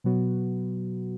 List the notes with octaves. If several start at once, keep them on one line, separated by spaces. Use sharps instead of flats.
B2 F#3 B3 F#4